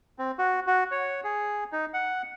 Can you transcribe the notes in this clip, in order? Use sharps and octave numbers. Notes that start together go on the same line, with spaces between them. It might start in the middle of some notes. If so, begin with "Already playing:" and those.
C4
F#4
F#4
C#5
G#4
D#4
F#5